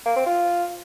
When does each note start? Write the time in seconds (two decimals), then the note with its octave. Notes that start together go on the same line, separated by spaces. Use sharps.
0.06 A#3
0.16 C4
0.26 F4